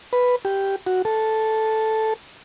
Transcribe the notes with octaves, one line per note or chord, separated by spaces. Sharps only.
B4
G4
F#4
A4